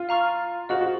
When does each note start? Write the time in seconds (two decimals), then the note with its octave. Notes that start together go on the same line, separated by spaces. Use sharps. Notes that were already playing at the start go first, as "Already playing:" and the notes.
Already playing: F4
0.09 F5 A#5 C#6 F6
0.69 F#4 G#4 C5 D#5
0.81 F#4